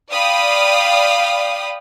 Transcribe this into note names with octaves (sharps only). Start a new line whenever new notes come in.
D5 F5 G5 B5 D#6